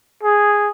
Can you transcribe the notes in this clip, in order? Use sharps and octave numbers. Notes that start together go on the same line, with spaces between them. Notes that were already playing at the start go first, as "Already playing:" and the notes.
G#4